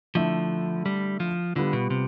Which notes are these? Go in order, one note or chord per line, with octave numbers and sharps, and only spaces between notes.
D3 F3 A3 E4
G3
F3
D3 G3 B3 F4
B2
C3